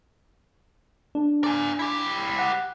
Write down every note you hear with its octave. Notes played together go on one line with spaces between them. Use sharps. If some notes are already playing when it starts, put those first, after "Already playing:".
D4
D5 G#5
E4 G4
F#5